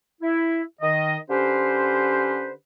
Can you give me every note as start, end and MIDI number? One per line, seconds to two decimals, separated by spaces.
0.21 0.61 64
0.81 1.16 51
0.81 1.16 75
1.29 2.52 50
1.29 2.52 61
1.29 2.52 67
1.29 2.52 71
1.29 2.52 72